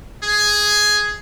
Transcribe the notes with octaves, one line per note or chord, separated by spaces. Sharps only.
G#4